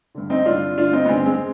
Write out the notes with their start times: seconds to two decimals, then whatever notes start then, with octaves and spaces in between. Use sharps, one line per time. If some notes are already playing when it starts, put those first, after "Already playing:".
0.15 G2 D3
0.30 C4 D#4
0.45 G2 D3 D4 F4
0.78 G2 D3 D4 F4
0.93 C4 D#4
1.05 B3
1.09 G2 D3 G#3 C4
1.25 G#3 C4